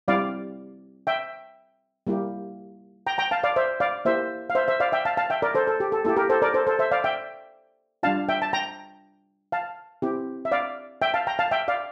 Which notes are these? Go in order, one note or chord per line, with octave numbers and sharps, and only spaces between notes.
G3 C4 E4 G4 D5 F5
E5 G5
G3 A#3 E4 G4
G5 A#5
G5 A#5
F5 A5
D5 F5
C5 E5
D5 F5
A#3 E4 G4 C5 E5
F5
C5 E5
C5 E5
D5 F5
E5 G5
F5 A5
F5 A5
E5 G5
A#4 D5
A4 C5
A4
G4
A4
A#3 E4 G4 A4
G4 A#4
A4 C5
A#4 D5
A4 C5
A4 C5
C5 E5
D5 F5
E5 G5
G3 D4 F4 F5 A5
E5 G5
A5
G5 A#5
F5 A5
C4 E4 G4
E5
D5 F5
E5 G5
F5 A5
G5 A#5
F5 A5
E5 G5
D5 F5